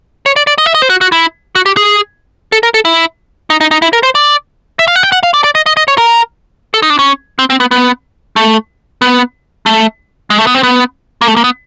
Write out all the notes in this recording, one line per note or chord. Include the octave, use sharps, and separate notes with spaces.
C#5
D5
D5
D#5
E5
D#5
C5
F#4
F#4
E4
F#4
G4
G#4
A4
A#4
A4
E4
D#4
D#4
D#4
E4
A#4
C5
D5
E5
F5
F#5
G5
F#5
F5
D5
D5
D#5
D#5
D#5
C#5
A#4
A4
D#4
D4
C#4
C4
C4
B3
B3
A3
B3
A3
G#3
A3
B3
C4
B3
A#3
A3
A#3
B3